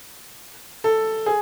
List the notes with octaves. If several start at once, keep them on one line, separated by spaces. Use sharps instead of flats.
A4
G#4